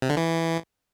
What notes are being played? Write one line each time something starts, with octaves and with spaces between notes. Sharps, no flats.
C3
D3
E3